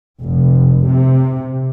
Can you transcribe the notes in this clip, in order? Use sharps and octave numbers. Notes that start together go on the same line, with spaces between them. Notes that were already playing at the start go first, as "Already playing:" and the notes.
F1
C3